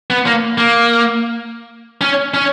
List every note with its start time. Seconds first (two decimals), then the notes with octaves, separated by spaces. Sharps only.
0.10 B3
0.26 A#3
0.58 A#3
2.01 C#4
2.34 C#4